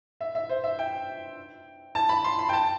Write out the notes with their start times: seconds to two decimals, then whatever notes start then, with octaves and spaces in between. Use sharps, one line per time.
0.21 E5
0.35 E5
0.49 C5
0.64 E5
0.79 G5
1.95 A5
2.09 B5
2.24 C6
2.39 B5
2.49 G5
2.53 A5